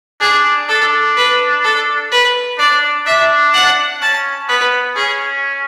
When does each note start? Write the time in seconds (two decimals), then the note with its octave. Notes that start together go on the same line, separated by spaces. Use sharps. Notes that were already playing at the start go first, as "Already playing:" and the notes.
0.21 D4 G#4
0.68 D4 A4
1.16 B4
1.64 A4
2.11 B4
2.58 D4 D5
3.06 D4 E5
3.54 F#5
4.01 C#4 A5
4.49 B3 B4
4.96 C#4 G#4